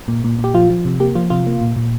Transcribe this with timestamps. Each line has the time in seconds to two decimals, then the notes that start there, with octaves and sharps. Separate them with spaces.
0.08 A#2
0.24 A#2
0.39 A#2
0.44 G4
0.54 F3 F4
0.70 F3
0.85 C3
1.00 A#3 G4
1.15 F3 F4
1.30 C3 F4
1.47 A#3
1.61 A#2
1.76 A#2